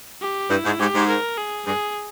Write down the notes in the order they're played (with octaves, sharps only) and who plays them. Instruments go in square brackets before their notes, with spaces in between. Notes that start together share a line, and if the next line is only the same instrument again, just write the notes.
[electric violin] G4
[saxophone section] G2 [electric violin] E4
[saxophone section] G#2
[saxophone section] G#2 [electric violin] G4
[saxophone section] G#2
[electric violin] A#4
G#4
[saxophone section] G2 [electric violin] G#4